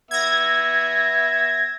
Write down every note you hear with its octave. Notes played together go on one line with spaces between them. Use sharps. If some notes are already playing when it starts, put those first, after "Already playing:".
B3 E5 G#6 A#6